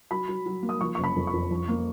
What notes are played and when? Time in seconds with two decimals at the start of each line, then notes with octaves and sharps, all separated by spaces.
0.11 F#3 B5
0.28 F#3
0.46 F#3
0.63 A#3
0.69 D#6
0.81 F3 C#6
0.95 F#1 C#6
1.04 B5
1.16 F2
1.27 C#6
1.33 F2
1.51 F3
1.68 A#3